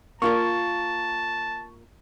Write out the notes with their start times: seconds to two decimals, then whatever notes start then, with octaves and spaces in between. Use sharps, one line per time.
0.22 A#3 F4 A#4 A5 C#6